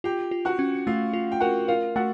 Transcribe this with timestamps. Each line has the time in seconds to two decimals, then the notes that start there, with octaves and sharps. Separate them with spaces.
0.04 F4 G4 G5
0.31 F4
0.45 F#4 F#5
0.59 C#4
0.87 A3 F4 F5
1.13 F4
1.32 G5
1.40 F#4 A#4 F#5
1.68 F4 A#4 F5
1.96 A3 F#4 F#5